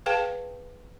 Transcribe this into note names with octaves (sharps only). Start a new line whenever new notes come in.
G#4 B4 F5 G5 A5